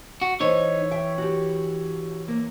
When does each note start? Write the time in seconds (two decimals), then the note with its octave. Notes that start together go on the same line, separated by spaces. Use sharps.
0.22 F#4
0.40 E3 D#4 A4 C5 C#5
0.91 E5 G5
1.18 F#4 G4
2.28 A#3